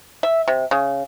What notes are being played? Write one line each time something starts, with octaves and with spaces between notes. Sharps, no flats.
E5
C3
C#3